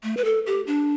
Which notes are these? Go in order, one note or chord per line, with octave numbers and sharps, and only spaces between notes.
A3
B4
A4
G4
D4